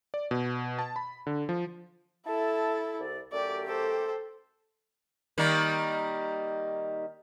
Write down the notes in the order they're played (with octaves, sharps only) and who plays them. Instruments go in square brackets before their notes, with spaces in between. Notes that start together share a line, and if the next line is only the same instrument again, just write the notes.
[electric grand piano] D5
B2
A5
B5
D3
F3
[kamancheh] E4 A4 [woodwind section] E5 A5
[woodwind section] C2 D5
[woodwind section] F#2 A3 G4 [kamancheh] D5
[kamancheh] A4 C5
[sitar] D#3 G3 A#3